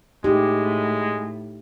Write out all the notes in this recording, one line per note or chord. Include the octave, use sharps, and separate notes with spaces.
A2 G#3 D#4 G4